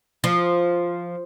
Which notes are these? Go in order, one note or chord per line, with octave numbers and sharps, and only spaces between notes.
F3